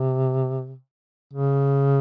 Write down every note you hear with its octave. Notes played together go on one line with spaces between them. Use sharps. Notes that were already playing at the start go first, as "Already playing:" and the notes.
Already playing: C3
C#3